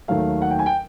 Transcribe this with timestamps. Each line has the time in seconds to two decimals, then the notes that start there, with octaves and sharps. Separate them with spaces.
0.08 D#2 D#3 F#3 A3 F5
0.42 F#5
0.50 G5
0.59 G#5
0.66 G5